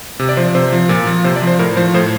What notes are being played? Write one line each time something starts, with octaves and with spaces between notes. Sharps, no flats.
C3
D5
F3 C5
C3 C5
F3
A#2
F3
C3 C5
D5
F3
C5
A2 A#4
F3 C5
A2 C5